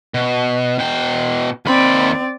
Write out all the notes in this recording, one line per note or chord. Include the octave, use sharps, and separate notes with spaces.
B2
B2 G5
D#2 C4 D5 B5